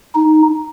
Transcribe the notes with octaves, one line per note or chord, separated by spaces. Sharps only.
D#4